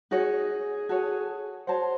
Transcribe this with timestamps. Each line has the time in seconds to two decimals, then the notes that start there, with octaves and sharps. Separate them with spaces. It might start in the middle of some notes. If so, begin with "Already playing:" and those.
0.11 D#4 F#4 G#4 C#5
0.89 F#4 A4 C#5
1.67 F#4 C5 C#5 F#5 A5